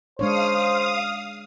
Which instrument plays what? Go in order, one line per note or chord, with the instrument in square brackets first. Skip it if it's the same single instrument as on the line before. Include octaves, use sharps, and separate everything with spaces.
[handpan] G#3 D4 C#5 [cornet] C5 [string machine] F5 D#6